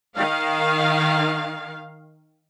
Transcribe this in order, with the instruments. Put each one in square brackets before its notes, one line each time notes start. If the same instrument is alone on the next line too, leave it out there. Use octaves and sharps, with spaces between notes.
[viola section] D#3 F5